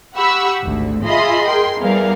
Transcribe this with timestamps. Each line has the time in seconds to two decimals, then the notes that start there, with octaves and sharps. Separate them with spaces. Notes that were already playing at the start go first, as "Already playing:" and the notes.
0.16 G4 F#5 B5 C#6 E6
0.63 G#1 D2
1.05 F4 G#4 D#5 E5 B5 C6
1.46 G#4 A#4 G5 C6
1.79 E2 G3 G#4 A#4 F5